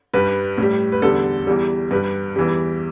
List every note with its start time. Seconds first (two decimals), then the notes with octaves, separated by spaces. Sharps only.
0.14 G2 G3 B4
0.58 A2 G3
0.92 B4
1.02 E2 D3 G3 A4
1.47 E2 E3 G3
1.91 G2 G3 B4
2.36 E2 E3 G3